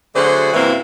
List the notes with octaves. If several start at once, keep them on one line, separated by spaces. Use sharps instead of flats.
D3 F#3 A3 F#4 G#4 C5
F#2 C3 E3 A#3 C4 E4